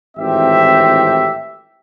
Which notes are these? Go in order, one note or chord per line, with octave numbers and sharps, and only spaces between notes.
G#1 A2 E3 C4 G4 E5